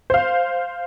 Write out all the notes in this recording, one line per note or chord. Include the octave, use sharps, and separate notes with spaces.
C5 F5